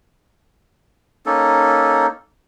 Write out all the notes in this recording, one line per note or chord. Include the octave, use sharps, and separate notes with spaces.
A#3 C#4 D#4 A4